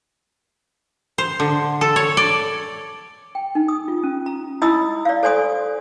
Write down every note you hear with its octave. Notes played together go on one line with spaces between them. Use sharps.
C5
D3
A4
C#5
D5
G5
D#4
D#6
F4
C#4
A#5
D#4 E4 D#5 B5 D#6 E6
D5 F5
A4 C5 D5 G#5 C6 D#6